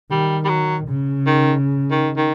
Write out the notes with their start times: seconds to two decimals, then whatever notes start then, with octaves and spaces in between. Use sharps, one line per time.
0.11 D#3 G3
0.45 G3
0.49 F#3
0.88 C#3
1.27 D#3
1.91 D#3
2.17 D#3